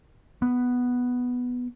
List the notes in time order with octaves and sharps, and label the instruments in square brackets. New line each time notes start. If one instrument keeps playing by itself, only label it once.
[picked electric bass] B3